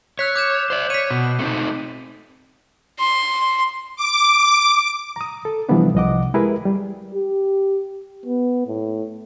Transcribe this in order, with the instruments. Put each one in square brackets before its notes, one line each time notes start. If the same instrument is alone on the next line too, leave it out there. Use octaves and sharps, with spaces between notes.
[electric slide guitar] C#5 [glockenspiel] E6 F#6 B6
[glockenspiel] D6 G6 E7
[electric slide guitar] C5 D5
[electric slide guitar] C#5 [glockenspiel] B6 D#7
[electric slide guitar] B2
A3 C4 D#4
[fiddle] C6
[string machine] D6
[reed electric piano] A#5 D#6
A4
C3 E3 F3 G3 B3 D4
C2 F3 D#5 F#5 D6
G#3 E4 G4 G#4 A#4 B4
G3
[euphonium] G4
B3
A2